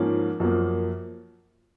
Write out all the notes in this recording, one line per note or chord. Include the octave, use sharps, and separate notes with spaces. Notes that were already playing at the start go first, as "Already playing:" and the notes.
Already playing: G#2 F3 A#3 C#4
F#2 F3 A#3